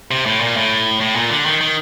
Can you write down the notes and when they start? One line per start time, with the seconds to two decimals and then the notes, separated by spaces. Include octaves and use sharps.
0.11 C3
0.26 A2
0.40 A#2
0.57 A2
1.01 A2
1.15 A#2
1.30 D3
1.46 D#3
1.61 D#3